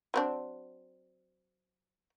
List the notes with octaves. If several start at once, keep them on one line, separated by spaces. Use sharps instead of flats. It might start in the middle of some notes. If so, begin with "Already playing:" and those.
F#3 C4 D4